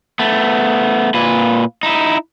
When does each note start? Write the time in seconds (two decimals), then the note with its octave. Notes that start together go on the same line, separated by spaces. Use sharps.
0.19 A3 B3
1.14 A#2 B4
1.83 D#4 E4